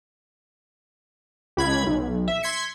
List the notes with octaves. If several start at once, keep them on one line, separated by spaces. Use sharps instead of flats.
C#2 B5 G#6
B1
E5
C6 G#6 B6 C#7